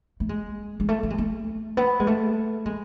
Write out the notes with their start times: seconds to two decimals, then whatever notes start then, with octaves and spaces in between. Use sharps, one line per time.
0.20 A3
0.29 G#3
0.80 G#3
0.89 A3
1.03 A3
1.10 G#3
1.18 A3
1.77 B3
2.00 G#3
2.07 A3
2.66 G#3